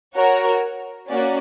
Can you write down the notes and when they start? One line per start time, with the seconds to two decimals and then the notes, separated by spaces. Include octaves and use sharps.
0.15 F#4 A#4 C#5
1.09 A#3 C#4 F#4 D5